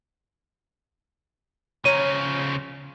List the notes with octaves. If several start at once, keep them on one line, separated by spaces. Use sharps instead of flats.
C#3 F3 C#5 A#5 D#7